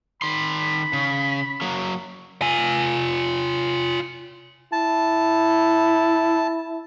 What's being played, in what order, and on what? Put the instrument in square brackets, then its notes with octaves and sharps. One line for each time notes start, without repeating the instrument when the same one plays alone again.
[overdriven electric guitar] D#3 C6 [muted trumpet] B5
[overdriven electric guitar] C#3
F#3 A#3
[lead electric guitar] F4 G#5
[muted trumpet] E4 [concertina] A5